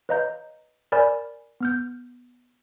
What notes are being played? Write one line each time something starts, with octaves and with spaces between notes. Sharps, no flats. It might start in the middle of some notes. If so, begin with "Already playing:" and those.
B4 C#5 D#5 F5 A#5 G6
A#4 C5 D5 G#5 B5 F6
B3 F6 G6